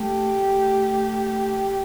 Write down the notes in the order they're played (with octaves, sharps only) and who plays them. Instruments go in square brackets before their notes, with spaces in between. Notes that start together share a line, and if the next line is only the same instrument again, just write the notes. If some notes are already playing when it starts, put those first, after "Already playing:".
Already playing: [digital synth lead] A3 [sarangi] G4